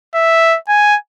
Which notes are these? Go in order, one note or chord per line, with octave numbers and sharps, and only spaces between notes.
E5
G#5